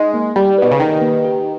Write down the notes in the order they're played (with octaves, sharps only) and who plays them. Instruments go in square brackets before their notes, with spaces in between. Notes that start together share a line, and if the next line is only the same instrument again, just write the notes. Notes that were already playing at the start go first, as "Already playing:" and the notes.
Already playing: [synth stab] G#3 [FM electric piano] D#4
[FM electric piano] A#3
[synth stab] G3 [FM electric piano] G4
[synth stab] B2 [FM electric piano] B4
[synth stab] C#3
[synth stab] D#3 [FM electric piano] D#4
[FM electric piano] A#3
G4